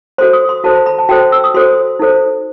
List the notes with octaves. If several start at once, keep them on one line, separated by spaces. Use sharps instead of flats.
F#4 A4 C5 C6
D#6
C6
F#4 A4 C5 A5
B5
B5
A5
F#4 A4 C5 G5
E6
D#6
F#4 A4 C5 C6
D#4 A4 C5